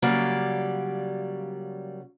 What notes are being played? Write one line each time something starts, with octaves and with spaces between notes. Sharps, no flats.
C#3 F#3 G3 A#3 D5